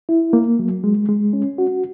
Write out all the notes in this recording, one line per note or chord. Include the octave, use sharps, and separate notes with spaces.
E4
A#3
F#3
G#3
G#3
C#4
F#4